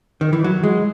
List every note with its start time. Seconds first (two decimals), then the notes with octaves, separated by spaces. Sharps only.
0.21 D#3
0.33 E3
0.44 F#3
0.64 G#3